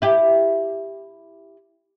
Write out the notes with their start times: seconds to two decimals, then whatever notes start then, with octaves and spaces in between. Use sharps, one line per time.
0.02 E4 G4